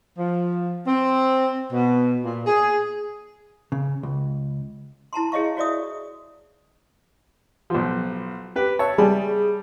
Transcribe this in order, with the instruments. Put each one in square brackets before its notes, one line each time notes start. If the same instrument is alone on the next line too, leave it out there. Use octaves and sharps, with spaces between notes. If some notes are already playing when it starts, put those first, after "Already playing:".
[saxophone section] F3
C4
B2
A#2
G#4
[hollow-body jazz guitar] C#3
C#2
[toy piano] E4 A5 A#5 C6
E4 G#4 C#5 D#5 F5 C#6
F#4 C#5 D5 E5 D#6
[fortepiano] B1 F3
G4 B4
[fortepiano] C#5 [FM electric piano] E5 A5
[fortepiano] G3 [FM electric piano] G#4